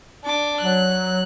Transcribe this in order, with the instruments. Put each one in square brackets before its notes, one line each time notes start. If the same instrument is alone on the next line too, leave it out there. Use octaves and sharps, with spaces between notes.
[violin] D4 D6
[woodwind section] F#3 [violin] F#6